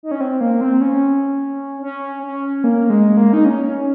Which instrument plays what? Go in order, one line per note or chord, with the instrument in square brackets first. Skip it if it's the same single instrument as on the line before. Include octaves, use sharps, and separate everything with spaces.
[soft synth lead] D#4
C#4
C4
A#3
C4
C#4
C#4
C#4
A#3
G#3
A#3
D#4
C#4
C#4